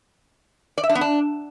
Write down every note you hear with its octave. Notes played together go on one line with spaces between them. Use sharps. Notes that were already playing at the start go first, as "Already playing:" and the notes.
D5
E5
D4
B3
D4